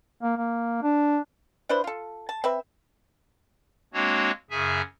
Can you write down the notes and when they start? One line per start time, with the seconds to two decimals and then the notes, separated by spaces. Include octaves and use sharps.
0.22 A#3
0.37 A#3
0.83 D4
1.69 D4 E4 B4 C5
1.84 F4 A4
2.29 A5
2.44 C4 B4 E5
3.94 G#3 A#3 C4 D4 F#4 C#5
4.50 F#2 C#3 G#4 E5 G#5